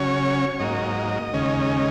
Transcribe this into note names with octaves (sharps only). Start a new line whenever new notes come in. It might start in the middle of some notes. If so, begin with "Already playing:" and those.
Already playing: C#3 F#3 C#4 C#5
G#2 F#3 A#3 D#5
D#2 C#3 G#3 C#4